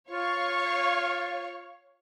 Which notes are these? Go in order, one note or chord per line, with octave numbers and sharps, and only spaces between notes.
F4 C#5 F5 C#6